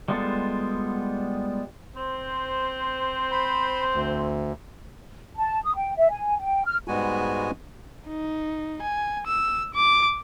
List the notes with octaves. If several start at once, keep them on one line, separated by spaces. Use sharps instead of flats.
G3 G#3 B3 F4 A4
C4 C5
B5
D2
A5
D#6
G5
E5
G#5
G5
F6
G#2 G3 G#3 B3 F#4 G#5
D#4
G#5
E6
D6